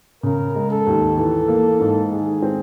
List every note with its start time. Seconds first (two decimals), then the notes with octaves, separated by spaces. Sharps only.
0.23 C#3 A#4
0.55 G#3
0.70 A4
0.87 D#2
1.17 E3 A4
1.48 A#3
1.80 G#2
2.11 D#3 G#4
2.42 C4